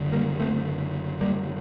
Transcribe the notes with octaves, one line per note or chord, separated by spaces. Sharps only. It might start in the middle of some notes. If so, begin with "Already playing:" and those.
Already playing: F#1 D3
G3 A#3
A3 C4
G3 A#3